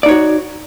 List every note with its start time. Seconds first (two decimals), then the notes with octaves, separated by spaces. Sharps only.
0.03 D5
0.06 D#4
0.08 C#5
0.11 F#4